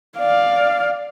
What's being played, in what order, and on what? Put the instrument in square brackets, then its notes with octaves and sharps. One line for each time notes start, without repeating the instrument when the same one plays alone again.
[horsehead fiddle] D5 F5